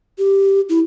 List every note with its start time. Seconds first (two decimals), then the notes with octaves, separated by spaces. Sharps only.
0.18 G4
0.69 E4